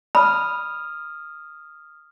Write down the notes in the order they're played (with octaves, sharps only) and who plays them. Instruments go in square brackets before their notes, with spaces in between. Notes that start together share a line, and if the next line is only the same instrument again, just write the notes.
[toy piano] B5 [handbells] D#6 F6